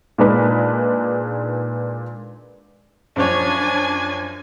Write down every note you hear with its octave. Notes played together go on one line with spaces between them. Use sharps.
A#2 G#3 D4 D#4 B4
F#2 F3 D4 C#5 G#5